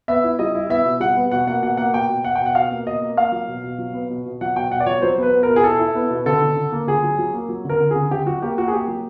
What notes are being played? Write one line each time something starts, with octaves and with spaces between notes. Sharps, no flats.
B3 E5
E4
G3 D#5
E4
B3 E5
B2
G3 F#5
B3
B2 F#5
A#3 F#5
B2 F#5
A#3 F#5
B2 G5
B2
B2 F#5
G5
B2
F#5
B2 F5
A#3
B2 D#5
A#3
A#3 F5
F#3
B2
B2
F#3
B3
B2
B2
F#3 F#5
B2 G5
B2 F#5
D5
F#3 C#5
F#3 C5
B3 B4
B3
A#4
B2
G#4
E4 A4
E4
B3
B2
D3 A4
D3
D3
A#3
D3 G#4
F#3
F#3
A#3
F#3
D3 A#4
D3
G#4
D3
D3 G4
F#3 F#4
A#3 G4
A#3 F#4
G#4
A#3 G4
F#3